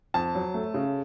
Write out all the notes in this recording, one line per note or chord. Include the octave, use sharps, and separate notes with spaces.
F2 A5
F#3
A3
C#3